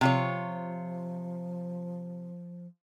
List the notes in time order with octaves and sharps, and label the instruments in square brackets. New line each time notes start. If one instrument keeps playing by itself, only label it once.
[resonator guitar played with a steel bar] C3 F4 C#5 [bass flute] F3